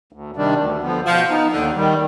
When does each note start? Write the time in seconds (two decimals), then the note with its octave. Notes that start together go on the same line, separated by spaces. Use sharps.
0.13 D2
0.36 C3 D#3 G3 D4
0.59 D2
0.82 D3 F3 B3
1.06 B2 F3
1.29 B3 D#4
1.52 D#2 D3
1.75 D#3 G3